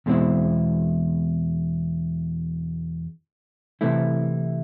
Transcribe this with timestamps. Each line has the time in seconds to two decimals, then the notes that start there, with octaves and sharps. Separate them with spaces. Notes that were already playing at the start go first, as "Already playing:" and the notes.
0.06 E2 B2 G#3 C4 E4
3.81 C3 E3 A3 E4